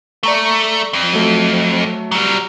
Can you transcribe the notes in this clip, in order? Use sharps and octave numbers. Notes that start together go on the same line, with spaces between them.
A3 D5 A#5 C#6
F2
F#3 A3
F#3 G3 A#5